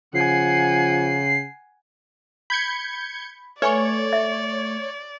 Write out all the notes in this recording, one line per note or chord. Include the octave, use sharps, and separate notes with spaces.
C#3 F3 F#5 G#5 C7
B5 G6 G#6 C#7
A3 B4 C#5 D5 G#5 C#6
E5